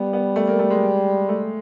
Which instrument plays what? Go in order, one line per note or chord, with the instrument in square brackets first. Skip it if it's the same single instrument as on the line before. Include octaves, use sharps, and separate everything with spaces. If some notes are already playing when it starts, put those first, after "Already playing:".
Already playing: [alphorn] G3 [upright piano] B3
[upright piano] B3
A3
A#3
A3
G#3
A3